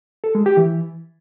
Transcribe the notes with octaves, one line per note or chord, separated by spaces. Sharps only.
A4
G#3
G4
E3